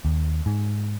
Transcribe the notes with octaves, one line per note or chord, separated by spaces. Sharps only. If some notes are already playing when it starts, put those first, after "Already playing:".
D#2
G#2